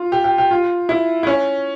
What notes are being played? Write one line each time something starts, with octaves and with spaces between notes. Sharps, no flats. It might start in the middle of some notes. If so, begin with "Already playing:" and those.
Already playing: F4
G4
G4
G4
F4
E4
E4
C#4